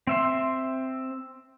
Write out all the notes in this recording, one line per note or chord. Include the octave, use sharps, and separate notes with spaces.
C4 E5 C6